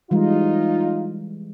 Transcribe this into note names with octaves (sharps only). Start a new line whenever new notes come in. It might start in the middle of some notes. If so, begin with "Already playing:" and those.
E3 G3 G#3 D#4 F4